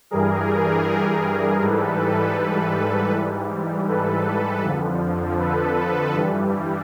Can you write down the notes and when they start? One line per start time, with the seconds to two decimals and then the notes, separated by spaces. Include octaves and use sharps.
0.11 G2 E3 G3 G#4 A#4
1.62 G#2 E3 G3 A4 B4
2.37 A4 B4
3.12 G#2 E3 G3
3.88 A4 B4
4.63 F2 D3 F3
5.39 A4 B4
6.14 G2 E3 G3